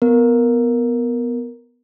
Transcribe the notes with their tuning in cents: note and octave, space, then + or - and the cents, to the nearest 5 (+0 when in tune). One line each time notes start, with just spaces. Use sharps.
B3 +0 A#4 +0